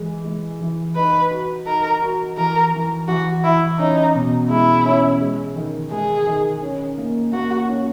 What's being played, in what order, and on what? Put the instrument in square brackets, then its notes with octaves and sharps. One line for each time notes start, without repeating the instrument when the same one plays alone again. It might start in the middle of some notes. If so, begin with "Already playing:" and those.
Already playing: [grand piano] E3 G#3
G#3
E3
[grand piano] D#4 [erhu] B4
[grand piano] F#4
[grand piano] D#4 [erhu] A#4
[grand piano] F#4
[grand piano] E3 [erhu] A#4
[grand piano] E3
[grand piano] E3 [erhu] F#4
[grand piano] E3 [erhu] E4
[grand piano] C#4 [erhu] D#4
[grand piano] B2
[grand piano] G#3 [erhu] E4
[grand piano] C#4
G#3
D#3
[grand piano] G#3 [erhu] G#4
[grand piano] D#3
C#4
A#3
[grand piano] A#3 [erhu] F#4
[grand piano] C#4